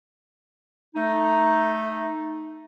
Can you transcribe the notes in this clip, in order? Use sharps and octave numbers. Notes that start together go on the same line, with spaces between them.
A3 D#4